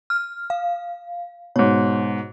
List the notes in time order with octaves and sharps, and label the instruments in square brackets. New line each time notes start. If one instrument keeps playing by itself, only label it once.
[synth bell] F6
F5
[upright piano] G#2 B2 [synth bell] C#5